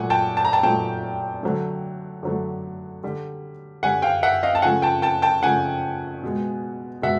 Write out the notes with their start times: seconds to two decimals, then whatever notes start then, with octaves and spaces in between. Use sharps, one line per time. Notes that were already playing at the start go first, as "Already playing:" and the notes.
Already playing: A#2 F#3 A3 F#5 G#5
0.10 G5 A5
0.37 A5
0.45 A#5
0.53 G5 A5
0.63 A#2 F#3 A3 G5 A5
1.43 D3 F#3 A3
2.23 D3 F#3 A3
3.04 D3 G3
3.83 D3 G3 F#5 G#5
4.02 F5 G5
4.23 E5 F#5
4.43 D#5 F5
4.55 A5
4.62 C#3 F3 A3 F#5 G#5
4.82 G5 A5
5.02 G5 A5
5.22 G5 A5
5.42 C#3 F3 A3 F#5 G#5
6.23 B2 G#3
7.02 B2 G#3 E5 F#5